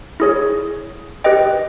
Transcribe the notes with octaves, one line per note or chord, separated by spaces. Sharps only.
E4 G#4 C#5
G4 B4 D#5 G5